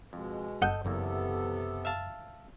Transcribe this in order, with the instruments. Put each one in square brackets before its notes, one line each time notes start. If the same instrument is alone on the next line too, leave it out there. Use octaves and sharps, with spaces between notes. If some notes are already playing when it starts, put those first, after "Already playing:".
[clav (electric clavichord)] F2 [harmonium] B2 G#3
[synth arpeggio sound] G1 F#5 G6 [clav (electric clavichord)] A4 D#5
[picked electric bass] F#1 [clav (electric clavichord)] B1 E2 A#3 [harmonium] C3 B3 A4
[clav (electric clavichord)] E5 F5 A5